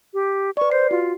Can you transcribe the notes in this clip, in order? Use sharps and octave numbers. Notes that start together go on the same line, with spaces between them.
G4
B4 D5 C#6
C5 C7
F4 F#4